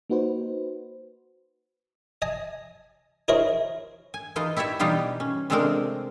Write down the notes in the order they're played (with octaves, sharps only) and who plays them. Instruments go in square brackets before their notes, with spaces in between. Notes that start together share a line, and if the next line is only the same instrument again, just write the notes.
[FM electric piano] A#3 D#4 F#4 B4 C5
[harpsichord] D#5 G#5 A5
D#4 E4 G#4 A#4 C5 C#5
[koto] G#5
E3 D#4 F4 D#5
E4 G4 C#5 D5 E5
B2 E3 G3 D#4 F4 G4
C#4
C3 G#3 A3 C4 D4 A#4